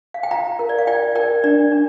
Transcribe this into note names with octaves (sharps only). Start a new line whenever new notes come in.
F5
G5
F4 F5 A#5
A#4
D5
F5
F4 D5 G5
A#4 D5 G5
D4 D5
D4